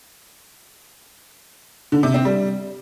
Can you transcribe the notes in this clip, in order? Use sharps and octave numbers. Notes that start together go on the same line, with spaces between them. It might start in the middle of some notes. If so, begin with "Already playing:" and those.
D3
C3
C4
G3